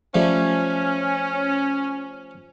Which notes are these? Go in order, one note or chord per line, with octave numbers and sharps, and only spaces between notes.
F3 G3 A3 C#4